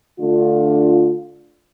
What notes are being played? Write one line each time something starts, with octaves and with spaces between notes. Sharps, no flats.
D3 A3 D4 F4